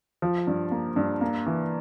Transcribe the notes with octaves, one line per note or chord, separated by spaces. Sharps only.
F3
G2
A#3
G2
A#3
E3